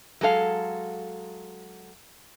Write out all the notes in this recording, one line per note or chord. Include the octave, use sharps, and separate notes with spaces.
F#3 G#3 A4 F5